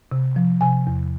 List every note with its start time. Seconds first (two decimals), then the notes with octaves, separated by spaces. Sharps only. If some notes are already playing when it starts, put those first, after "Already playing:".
0.11 C3
0.36 F3
0.61 C3 G#5
0.87 E2